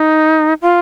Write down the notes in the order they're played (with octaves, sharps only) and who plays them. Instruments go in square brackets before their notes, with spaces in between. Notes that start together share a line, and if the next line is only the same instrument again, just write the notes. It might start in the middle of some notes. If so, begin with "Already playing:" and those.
Already playing: [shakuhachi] D#4
F4